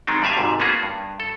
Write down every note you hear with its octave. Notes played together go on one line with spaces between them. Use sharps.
D#3 F#3 G#3 C4 D4 D#4
G2 G3 D5 E5 F5 G#5
G#1 G#2 C3
A#3 B3 C#4 F4 F#4 G#4
G2
A4